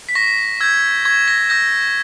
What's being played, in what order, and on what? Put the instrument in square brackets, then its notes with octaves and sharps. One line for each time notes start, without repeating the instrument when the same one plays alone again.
[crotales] B6
C#6 A#6
E6 G6 G#6
C#6 G#6
A#6
E6 G6 A#6